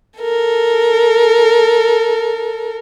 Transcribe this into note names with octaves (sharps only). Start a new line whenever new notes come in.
A4 A#4